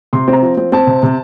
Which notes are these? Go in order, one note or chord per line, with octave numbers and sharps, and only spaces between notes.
C3 C6
C4
A#5
F3
C4
C4 A5
C3
C3